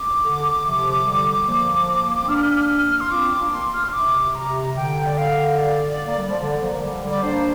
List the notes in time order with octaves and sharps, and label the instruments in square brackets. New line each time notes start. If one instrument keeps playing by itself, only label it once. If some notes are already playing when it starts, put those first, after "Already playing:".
Already playing: [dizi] D6
[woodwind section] D3
C3 F3
D3 G3
F3 A#3
C4
[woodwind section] A#3 D4 [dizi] F6
[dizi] F6
C6
[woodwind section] C4 F4 [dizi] D6
[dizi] D6
[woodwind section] A#3 D4
[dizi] D6
C6
F6
C6
[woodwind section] C3 [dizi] D6
[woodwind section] C3 [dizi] A#5
[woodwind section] D3 [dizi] G5
[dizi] D5
F5
D5
[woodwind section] A#3
G3
F3
D3
F3 A#3
D3 G3
D3 G3
[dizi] D5
[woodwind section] A#3 D4 [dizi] C5